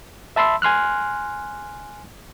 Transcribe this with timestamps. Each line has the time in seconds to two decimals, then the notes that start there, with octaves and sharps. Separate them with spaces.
0.36 E5 A5 B5 C6 E6
0.62 G#5 C6 F6 F#6